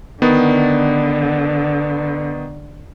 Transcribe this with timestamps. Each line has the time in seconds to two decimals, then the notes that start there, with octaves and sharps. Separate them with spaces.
0.22 D3 D#3 B3